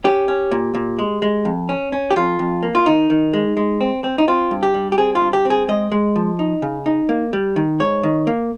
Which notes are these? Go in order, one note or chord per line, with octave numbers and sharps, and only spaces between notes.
C#4 G4
C#4
A#2
A#2
G#3
G#3
F2
C#4
C#4
G4
F2 F4
F2
A#3
F4
D#3 D#4
D#3
G#3
G#3
C4
C4
D#4
C4 F4
G2
G4
G3
G4
C4 G#4
F4
G2
G4
C4
G#4
G#3 D#5
G#3
F3
D#4
C#3
D#4
A#3
G3
D#3
G#2 C#5
D#3
A#3